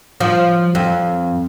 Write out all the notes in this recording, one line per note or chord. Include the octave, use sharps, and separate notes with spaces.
F3
F2